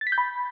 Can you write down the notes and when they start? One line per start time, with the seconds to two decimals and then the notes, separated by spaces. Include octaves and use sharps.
0.01 A6
0.07 B6
0.12 G6
0.18 B5